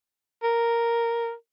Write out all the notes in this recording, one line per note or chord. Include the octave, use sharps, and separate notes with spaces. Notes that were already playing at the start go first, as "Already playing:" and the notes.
A#4